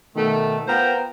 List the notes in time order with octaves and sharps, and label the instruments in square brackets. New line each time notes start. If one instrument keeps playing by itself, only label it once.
[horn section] B2 D#3 A3
B3 F4 A#4 C5 G5